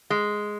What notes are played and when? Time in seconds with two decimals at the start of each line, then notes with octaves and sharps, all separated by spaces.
0.10 G#3